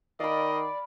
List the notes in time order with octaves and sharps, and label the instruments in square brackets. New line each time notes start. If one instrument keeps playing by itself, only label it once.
[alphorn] D#3 [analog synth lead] D5 [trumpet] D#5 [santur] F5 B5